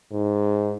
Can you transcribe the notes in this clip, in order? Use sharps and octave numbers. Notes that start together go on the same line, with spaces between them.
G#2